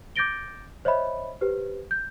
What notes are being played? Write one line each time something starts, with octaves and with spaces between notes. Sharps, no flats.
D6 G6 A6 A#6 D7 G7
C5 C#5 D#5 E5 B5
G4 B4 C5
G6